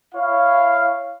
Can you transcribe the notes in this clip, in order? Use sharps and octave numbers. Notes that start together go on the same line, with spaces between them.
E4 C#5 F5